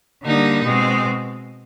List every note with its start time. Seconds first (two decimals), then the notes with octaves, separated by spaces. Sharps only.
0.23 D3 G3 A#3 D#4
0.64 B2 G#3 C4